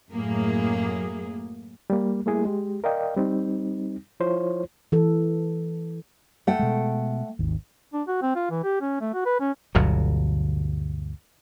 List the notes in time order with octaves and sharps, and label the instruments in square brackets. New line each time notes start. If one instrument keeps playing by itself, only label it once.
[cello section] F#2 A2 F#3 A#3 G#4
[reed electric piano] G3 A#3
G3 A3 A#3 E4 G#4
G#3 G4
A#4 D5 D#5 F5 G5
G3 C4 D#4
F3 E4 F4 C5 C#5
[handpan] E3 A4
[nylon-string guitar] A3 F#5 G5
[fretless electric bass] B2 G#3
G#1 D#2
[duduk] D4
F#4
C4
F4
E3
G4
C#4
A3
F#4
B4
C#4
[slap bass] G1 D2 B2 F#3